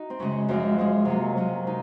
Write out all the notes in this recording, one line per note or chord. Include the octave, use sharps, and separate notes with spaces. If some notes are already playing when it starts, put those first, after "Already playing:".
Already playing: D#4 F#4
C4
F#2 C#3 G#3 C#4
F#2 F3 G#3 C4
F#2 F3 G#3
C3 F#3 A#3
C3 F#3 A#3 C#4
C3 D#4